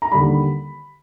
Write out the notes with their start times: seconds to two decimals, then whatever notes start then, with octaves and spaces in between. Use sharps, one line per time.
0.02 A#5
0.12 D#2 D3 G3 B5